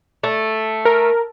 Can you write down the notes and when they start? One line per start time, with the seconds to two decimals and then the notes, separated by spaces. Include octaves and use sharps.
0.23 A3
0.85 A#4